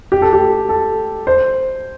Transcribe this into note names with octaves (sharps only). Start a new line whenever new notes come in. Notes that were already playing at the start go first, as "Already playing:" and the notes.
G4
A4
G4
A4
C5